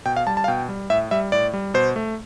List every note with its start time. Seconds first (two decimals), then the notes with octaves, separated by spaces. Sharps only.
0.05 B2 G5
0.16 F5
0.27 G3 A5
0.37 A5
0.44 F5
0.48 B2 G5
0.69 G3
0.90 A2 E5
1.11 G3 E5
1.32 A2 D5
1.54 G3
1.74 B2 C5
1.96 A3